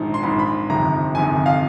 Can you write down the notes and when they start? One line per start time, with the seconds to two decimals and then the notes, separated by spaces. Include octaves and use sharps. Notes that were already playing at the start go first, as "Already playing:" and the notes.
Already playing: A#1 G#2 D#3
0.14 C6
0.23 A#1 G#2 D#3 B5
0.39 B5
0.69 G1 F2 C3 D#3 A#5
1.15 G1 F2 C3 D#3 G#5
1.46 F5